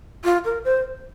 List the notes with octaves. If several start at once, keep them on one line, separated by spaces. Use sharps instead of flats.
F4
A#4
C5